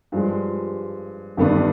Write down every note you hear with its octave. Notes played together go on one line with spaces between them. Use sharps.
G2 F3 G#3
G1 G2 D#3 B3 D4